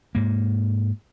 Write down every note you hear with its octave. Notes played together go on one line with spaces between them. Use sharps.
G#2 A#3